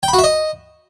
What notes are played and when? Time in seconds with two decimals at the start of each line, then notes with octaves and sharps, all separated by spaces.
0.03 G5
0.08 B5
0.13 F#4
0.19 E5
0.24 D#5